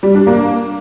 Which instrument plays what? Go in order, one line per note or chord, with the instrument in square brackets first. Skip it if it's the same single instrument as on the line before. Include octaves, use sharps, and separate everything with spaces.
[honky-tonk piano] G3
D4
A#3